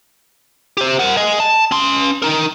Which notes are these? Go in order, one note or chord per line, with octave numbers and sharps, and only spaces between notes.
G4 C5
A#4 F#5
D#5 G#5
A5
C#4 C6
D#4 A#4